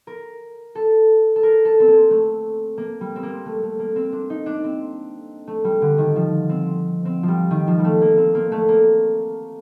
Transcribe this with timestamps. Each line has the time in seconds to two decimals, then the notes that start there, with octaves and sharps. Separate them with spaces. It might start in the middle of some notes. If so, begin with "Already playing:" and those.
0.07 A#4
0.75 A4
1.36 A4
1.43 A#4
1.65 A4
1.80 C4
1.87 A#3
2.10 A3
2.78 A#3
3.01 G3
3.16 C4
3.23 A#3
3.46 A3
3.63 A3
3.79 A#3
3.96 C4
4.12 D4
4.30 D#4
4.46 D4
4.64 C4
5.47 A3
5.64 G3
5.82 D3
5.98 D#3
6.16 F3
6.49 C4
7.05 C4
7.23 F3 G3
7.51 D#3
7.67 F3
7.79 G3
7.84 A3
8.02 A#3
8.17 C4
8.34 A#3
8.52 A3
8.69 A#3